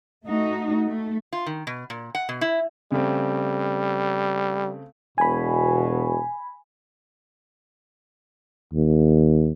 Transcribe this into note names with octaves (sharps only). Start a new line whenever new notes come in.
A3 D#4 F#4
A3
F4
D#3
B2
A#2
F#5
B2
E4
C#3 G3 A3 C4
E1 B2 G#5 B5
D#2